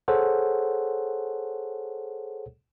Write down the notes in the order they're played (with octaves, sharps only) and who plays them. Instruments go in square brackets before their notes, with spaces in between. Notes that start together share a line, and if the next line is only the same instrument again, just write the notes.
[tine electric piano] G#4 A4 C5 C#5 F#5